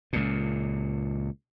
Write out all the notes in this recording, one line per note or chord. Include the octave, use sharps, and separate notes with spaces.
C#2 A#2